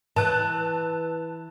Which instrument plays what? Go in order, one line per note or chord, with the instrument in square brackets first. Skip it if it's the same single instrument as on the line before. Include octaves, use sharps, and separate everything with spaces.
[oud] E3 [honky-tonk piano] A5 F#6